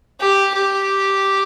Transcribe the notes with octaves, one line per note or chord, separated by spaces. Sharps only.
G4
G4